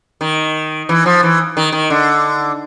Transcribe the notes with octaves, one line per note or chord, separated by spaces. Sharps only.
D#3
E3
F3
E3
D#3
D#3
D3